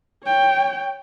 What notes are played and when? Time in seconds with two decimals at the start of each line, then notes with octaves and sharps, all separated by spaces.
0.23 C#5 G5